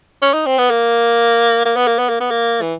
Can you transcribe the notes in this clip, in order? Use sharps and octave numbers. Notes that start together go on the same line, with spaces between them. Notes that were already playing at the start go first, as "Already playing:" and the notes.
C#4
D#4
C4
B3
A#3
A#3
B3
A#3
B3
A#3
B3
A#3
E3